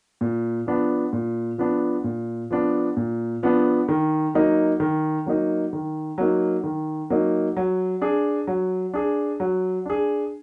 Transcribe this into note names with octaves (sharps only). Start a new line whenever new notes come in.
A#2
F3 B3 D4
A#2
F3 B3 D4
A#2
F3 B3 D4
A#2
F3 B3 D4
D#3
F#3 A#3 D#4
D#3
F#3 A#3 D#4
D#3
F#3 A#3 D#4
D#3
F#3 A#3 D#4
F#3
D4 G#4
F#3
D4 G#4
F#3
D4 G#4